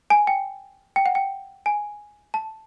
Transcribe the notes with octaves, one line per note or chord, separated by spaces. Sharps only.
G#5
G5
G5
F#5
G5
G#5
A5